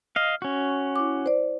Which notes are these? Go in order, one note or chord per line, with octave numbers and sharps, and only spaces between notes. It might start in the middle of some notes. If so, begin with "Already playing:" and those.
D#5 F5 F6
C#4 F#4
E4 D6
C5 D5